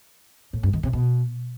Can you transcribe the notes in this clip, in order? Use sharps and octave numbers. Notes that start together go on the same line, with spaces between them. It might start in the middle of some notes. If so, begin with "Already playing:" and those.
A2
G2
D#3
C3
B2